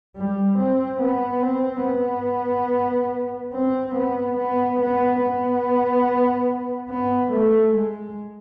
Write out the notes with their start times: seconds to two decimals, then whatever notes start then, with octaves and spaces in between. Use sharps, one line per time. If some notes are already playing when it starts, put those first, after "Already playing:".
0.17 G3
0.58 C4
1.01 B3
1.42 C4
1.85 B3
3.53 C4
3.95 B3
4.38 B3
4.80 B3
5.22 B3
6.90 B3
7.32 A3
7.74 G#3